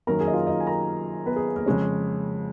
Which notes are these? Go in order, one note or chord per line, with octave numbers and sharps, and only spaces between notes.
F#2 D#3 A#3 A#4 A#5
G#4 G#5
D#5
F4 F5
D#4 D#5
G#5
A#4 A#5
B3 B4
G#4
A#3 A#4
F2 C#3 G#3 C#4